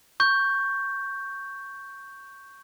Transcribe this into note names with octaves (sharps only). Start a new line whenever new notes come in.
C#6 G6